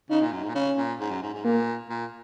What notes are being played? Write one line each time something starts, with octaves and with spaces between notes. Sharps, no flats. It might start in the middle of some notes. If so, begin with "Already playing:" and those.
C#3 D#4
A#2
F#2
G#2
A#2
C#3 C#4
A#2
G#2
F#2
G#2
G#2
A#2 A#3
A#2